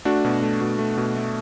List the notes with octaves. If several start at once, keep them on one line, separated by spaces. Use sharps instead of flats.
A3 D4 F#4
B2
A3
B2
A3
B2
A3